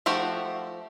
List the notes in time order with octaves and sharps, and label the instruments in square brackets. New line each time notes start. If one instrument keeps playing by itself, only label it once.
[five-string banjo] F3 A3 F#4 G4